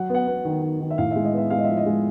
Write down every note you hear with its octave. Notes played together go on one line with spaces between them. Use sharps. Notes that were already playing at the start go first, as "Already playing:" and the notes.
Already playing: F#3 F#5
B3
F#5
B3
D#3
D#3
D#3
E5
A2 F5
G#3 E5
D#5
B3 E5
G#3 F5
D#5
F3 E5
D#5
G#3